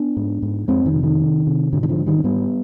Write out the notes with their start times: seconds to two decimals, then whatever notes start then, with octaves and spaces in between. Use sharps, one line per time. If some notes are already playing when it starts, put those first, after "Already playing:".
Already playing: B3 D4
0.17 G#2
0.42 G#2
0.68 F2 G#3 C4
0.86 D#3
0.94 C3
1.03 D#3
1.21 C3
1.47 C3
1.73 G#2 D3
1.83 D#3
1.89 D3 F3
1.98 G#2
2.06 D#3 G3
2.18 C4
2.24 G#2 G3 B3